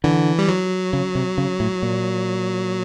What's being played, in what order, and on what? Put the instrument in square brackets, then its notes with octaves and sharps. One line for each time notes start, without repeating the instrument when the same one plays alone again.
[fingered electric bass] D3 [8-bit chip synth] E3
[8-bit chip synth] G3
F#3
[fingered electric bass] C#3
C3
C#3
A2
A#2